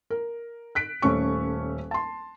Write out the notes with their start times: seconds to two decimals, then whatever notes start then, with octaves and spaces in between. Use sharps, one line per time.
0.10 A#4
0.75 F#6 B6 D7
1.02 D#1 A3 C#4 C#6
1.91 A5 C6